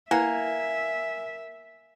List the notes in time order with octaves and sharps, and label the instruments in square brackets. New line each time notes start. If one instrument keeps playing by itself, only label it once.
[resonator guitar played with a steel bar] A#3 [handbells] E4 B4 F#5 [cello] E5 [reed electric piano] G#5